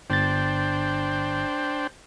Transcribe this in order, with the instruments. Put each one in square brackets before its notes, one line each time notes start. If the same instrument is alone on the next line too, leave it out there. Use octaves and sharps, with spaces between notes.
[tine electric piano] G1 A6 [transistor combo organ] D4 C5 G5